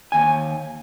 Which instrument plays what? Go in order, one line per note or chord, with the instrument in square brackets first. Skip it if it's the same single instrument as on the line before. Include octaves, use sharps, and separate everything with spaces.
[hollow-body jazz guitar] D#2 G#5